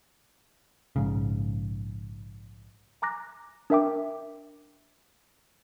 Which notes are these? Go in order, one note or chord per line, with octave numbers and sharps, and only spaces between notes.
A#1 G#2 C#3
G#5 A#5 D6 F#6 A#6
D4 A#4 E5 G5 D6